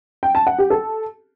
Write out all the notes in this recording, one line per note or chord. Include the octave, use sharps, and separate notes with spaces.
G5
A5
F#5
G4
A4